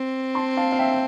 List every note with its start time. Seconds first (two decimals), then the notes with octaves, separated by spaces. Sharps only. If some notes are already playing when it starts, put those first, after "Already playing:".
Already playing: C4
0.35 A5 C6
0.57 F5 A5
0.72 F5
0.79 E5 G5
0.92 G5